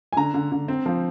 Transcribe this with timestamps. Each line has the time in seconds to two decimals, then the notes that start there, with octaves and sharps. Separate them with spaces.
0.12 G#5
0.17 D3 A#5
0.34 D3
0.52 D3
0.68 C4
0.86 F3